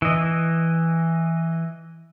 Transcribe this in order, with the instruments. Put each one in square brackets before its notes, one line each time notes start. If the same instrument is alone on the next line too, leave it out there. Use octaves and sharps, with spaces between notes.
[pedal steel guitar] E3 D#5